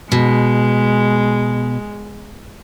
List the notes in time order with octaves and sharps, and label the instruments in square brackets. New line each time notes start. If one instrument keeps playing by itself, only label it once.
[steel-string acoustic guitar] B2 [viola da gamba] G#3